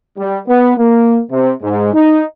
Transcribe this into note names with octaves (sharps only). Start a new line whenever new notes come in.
G3
B3
A#3
C3
G#2
D#4